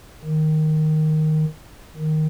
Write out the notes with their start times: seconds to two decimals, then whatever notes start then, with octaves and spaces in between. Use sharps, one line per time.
0.24 D#3
1.97 D#3